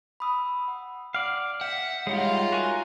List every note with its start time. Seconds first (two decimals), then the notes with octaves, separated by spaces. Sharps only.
0.20 B5 D#6 E6
0.68 F#5
1.14 D5 F5 F#5
1.61 E5 F#5 G6
2.07 G3 G#3 D#4 F4 C#5 E5 F5
2.52 F#4 A#4 G#5